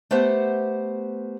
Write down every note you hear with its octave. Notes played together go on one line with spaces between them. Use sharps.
A3 B3 G4 C5 F#5